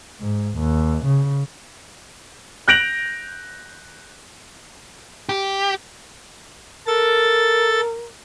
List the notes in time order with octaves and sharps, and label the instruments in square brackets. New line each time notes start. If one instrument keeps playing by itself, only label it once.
[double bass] G#2
D#2
C#3
[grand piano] F#6 G6 A#6 D7 F7 F#7
[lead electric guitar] G4
[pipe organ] A4 A6 [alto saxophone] A#4